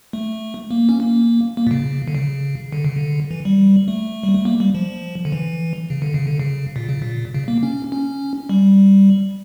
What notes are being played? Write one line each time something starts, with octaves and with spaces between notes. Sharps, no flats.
A3
A#3
C#4
A#3
A#3
A#2
C#3
D3
C#3
D3
C#3
D3
E3
G3
A3
G3
A3
A#3
G3
F3
D3
E3
C#3
D3
C#3
D3
C#3
A#2
C#3
A#2
C#3
A#3
C#4
C#4
G3